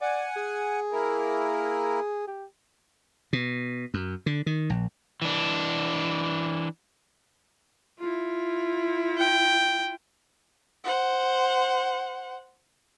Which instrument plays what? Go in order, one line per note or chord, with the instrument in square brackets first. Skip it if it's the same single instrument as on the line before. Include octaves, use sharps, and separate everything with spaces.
[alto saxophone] D5 [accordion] F#5 G#5
[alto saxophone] G#4
[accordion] A#3 E4 A#4
[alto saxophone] G4
[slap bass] B2
F#2
D3
D#3
A#1
[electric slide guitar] E3 D4
[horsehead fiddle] E4 F4
[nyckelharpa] G5
[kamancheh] C5 F#5